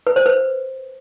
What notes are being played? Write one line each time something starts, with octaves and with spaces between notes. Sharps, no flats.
B4
C5
B4